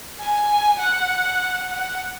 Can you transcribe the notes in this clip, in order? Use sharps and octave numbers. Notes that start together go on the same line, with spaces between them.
G#5
F#5
F#5